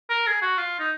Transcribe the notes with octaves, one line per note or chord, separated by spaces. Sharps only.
A#4
G#4
F#4
F4
D#4